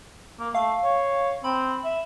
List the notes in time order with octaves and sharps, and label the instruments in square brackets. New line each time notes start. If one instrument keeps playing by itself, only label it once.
[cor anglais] A#3
[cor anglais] A3 [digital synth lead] F5
[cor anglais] C#5
[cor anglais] C4 [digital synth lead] B5
[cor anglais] E5